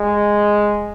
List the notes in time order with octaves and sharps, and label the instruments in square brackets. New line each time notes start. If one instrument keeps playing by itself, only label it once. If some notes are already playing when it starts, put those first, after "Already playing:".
Already playing: [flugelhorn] G#3